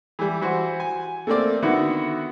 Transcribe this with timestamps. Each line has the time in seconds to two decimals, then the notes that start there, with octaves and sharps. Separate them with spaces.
0.19 E3 G3
0.41 E3 F#4 C5
0.80 G#5
1.27 A3 A#3 C4 D5
1.62 D3 D#3 B3 E4 F#4